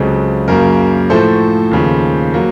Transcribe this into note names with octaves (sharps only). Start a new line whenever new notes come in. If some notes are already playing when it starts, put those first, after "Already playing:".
Already playing: C#2 C#3 F#3 C4 A4
F#2 C#3 F#3 A#3 A#4
A2 F3 A3 A4 C5
D#2 C#3 F3
F#3 A#3